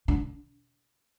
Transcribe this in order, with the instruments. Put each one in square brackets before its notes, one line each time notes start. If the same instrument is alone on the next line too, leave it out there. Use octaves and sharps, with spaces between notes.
[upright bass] D3